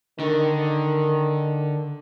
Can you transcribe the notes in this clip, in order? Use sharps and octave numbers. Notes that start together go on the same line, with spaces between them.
D3 D#3 A#4